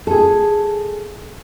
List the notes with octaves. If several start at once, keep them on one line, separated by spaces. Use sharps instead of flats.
G#4 A4